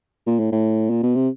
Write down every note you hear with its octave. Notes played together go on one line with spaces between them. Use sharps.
A#2
A2
A2
A#2
B2
C3